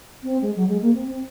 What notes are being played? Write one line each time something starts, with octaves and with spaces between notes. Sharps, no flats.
C4
G#3
F#3
G#3
A#3
C4
C4